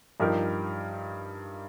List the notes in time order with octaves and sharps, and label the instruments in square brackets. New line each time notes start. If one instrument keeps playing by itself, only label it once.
[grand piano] G2 F3 D#4 G4 A#4